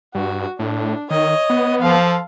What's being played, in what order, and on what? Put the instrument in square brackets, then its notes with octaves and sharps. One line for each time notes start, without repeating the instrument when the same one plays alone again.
[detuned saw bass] G2 [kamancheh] F#4
[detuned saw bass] A2 [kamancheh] D4
[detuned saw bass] D#3 [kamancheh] C#5 D#5
[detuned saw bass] B3
[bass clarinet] F3 [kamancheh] A4 F5